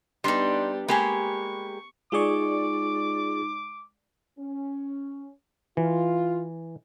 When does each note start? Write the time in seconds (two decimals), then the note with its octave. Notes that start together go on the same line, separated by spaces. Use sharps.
0.24 G3 B3 D4 D#4 G4 C6
0.88 G#3 A#3 G4 G#5 B5 C#6
2.12 G#3 D#4 F4 G#4 D5 C#6 D6
4.39 C#4
5.77 E3 F4